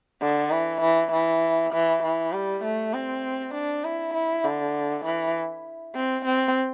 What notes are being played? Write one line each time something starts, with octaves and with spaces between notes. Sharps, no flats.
D3
E3
E3
E3
E3
E3
G3
A3
C4
D4
E4
E4
D3
E3
C4
C4